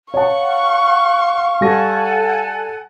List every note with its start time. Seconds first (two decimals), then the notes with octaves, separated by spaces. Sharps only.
0.14 C#5 F5 F#5 A5 C#6
1.61 G3 A4 F#5 G#5 A#6